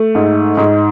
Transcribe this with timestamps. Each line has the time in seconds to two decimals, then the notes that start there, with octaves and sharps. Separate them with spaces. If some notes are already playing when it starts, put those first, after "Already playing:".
Already playing: A3
0.15 G#2
0.57 G#2